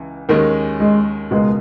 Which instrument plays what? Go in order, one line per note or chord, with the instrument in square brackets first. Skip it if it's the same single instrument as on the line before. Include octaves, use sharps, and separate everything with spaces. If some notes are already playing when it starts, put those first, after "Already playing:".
Already playing: [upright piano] C#2 C#3 E3
[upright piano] D#2 D#3 G#3 C#4 [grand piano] A#3
[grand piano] G#3
[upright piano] C#2 B2 A#3 [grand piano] G#3